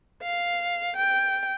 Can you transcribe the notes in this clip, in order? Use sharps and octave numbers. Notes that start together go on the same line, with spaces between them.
F5
G5